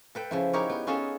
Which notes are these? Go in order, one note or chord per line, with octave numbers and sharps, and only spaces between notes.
A4 B4 G5
C#3 F3 E4
D#4 E4 G4 A#4 C#5
B3
B3 C#4 F4 G#4 A4